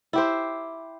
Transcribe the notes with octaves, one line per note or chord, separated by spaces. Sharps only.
E4 G4 C5